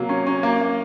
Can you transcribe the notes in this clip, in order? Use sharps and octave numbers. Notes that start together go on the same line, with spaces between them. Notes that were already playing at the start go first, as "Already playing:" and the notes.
Already playing: C3 F#3 A#3
C#4
C#4
A#3
A#3